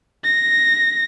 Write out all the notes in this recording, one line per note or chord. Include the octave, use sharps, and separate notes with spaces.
A#6